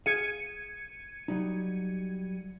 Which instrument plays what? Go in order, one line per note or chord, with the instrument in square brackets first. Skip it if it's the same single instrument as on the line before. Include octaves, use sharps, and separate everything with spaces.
[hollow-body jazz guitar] G#4 F5 [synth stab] G#6 C#7 D#7
[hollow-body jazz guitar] F#3 G3 D#4